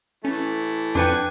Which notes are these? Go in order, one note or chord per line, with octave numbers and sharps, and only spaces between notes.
E3 A3 C#4
F2 D4 B4 G5 G#5 C#7